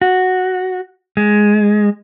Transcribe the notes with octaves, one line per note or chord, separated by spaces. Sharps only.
F#4
G#3